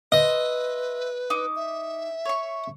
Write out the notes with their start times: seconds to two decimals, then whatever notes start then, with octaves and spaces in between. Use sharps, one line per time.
0.12 B4 C5 D#5 E5
1.30 D#4 D6
1.56 E5
2.25 C#5 C#6